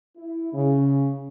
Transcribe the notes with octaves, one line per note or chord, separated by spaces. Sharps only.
E4
C#3